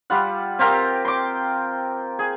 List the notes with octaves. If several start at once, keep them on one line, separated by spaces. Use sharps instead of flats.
G3 F4 F#5
C4 F4 G4 A#4
C6 D6
G#4